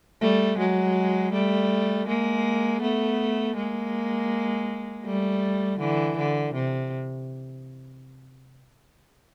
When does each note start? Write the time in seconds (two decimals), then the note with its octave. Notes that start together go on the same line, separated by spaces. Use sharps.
0.21 G3 A3
0.58 F#3 G#3
1.32 G3 A3
2.08 G#3 A#3
2.82 A3 B3
3.56 G#3 A#3
5.05 G3 A3
5.80 D3 E3
6.18 D3
6.54 C3